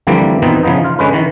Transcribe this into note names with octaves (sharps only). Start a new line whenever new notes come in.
D3 E3 F3 G3 A#3 C4
B2 D#3 E3 C4 D#4 E4
C#3 E3 F3 B3 D#4
F4
D3 G#3 C#4 B4
D#3 E3